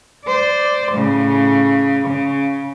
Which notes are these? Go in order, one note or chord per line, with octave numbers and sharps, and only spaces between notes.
C5 D5
A2 C#3
C#3